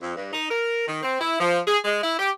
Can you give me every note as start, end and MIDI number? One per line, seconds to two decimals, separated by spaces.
0.02 0.16 41
0.17 0.33 43
0.33 0.48 63
0.50 0.84 70
0.88 1.00 51
1.03 1.17 60
1.20 1.36 64
1.39 1.60 53
1.67 1.78 68
1.84 2.00 56
2.04 2.17 64
2.19 2.30 67